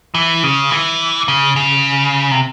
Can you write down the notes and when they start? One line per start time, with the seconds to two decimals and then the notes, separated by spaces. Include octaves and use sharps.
0.15 E3
0.43 C#3
0.71 E3
1.28 C#3
1.56 C#3
2.31 C3